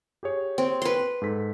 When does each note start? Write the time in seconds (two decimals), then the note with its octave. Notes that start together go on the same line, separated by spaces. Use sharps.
0.23 G4 G#4 C#5
0.58 C4
0.82 B4 C6
1.22 G#2 A4 B6